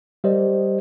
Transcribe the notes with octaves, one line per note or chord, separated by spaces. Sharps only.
G3 G4 A#4 C5 D5 D#5